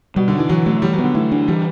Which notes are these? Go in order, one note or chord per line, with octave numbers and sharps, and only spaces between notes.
B2 G3
D3
D4
E3
E3 F#3
F#3 A3
E3 G3
F#3
B3
D3
E3 A3
D4
E3 G3